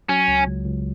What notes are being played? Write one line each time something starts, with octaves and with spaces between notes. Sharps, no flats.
F#3 C#4
C#2
C#2
C#2